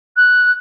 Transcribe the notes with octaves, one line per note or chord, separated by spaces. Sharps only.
F#6